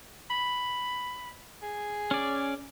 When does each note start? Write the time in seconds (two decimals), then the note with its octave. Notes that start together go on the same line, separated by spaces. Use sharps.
0.30 B5
1.62 G#4
2.11 C#4 D5